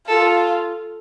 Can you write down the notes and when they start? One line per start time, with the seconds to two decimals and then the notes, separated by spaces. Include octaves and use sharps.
0.08 F4 A4